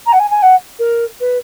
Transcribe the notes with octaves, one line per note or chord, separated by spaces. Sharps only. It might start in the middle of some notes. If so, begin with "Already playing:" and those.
A#5
F#5
G#5
G#5
F#5
A#4
B4